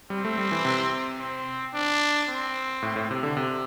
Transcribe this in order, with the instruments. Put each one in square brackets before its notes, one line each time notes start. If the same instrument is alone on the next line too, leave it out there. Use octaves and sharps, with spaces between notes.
[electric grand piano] G3 [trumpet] C4
[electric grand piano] A3
G3
E3
C3
[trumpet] C4
D4
C4
[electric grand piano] A2
A2
C3
D3
C3